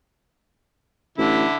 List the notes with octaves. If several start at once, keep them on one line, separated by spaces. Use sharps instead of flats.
A1 D3 E4